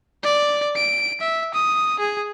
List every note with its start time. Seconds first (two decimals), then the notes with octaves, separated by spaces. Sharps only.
0.23 D5
0.76 D7
1.21 E5
1.54 D#6
1.99 G#4